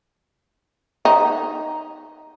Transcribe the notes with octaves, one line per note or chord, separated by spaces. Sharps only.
D#4